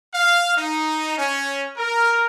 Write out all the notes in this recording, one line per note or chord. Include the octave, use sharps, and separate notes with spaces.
F5
D#4
C#4
A#4